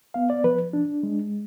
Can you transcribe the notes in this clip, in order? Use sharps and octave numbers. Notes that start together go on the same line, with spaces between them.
B3 F5
D5
F3 B4
D4
G#3